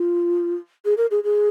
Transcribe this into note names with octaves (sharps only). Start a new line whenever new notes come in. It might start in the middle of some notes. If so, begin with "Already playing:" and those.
Already playing: F4
G#4
A#4
G#4
G#4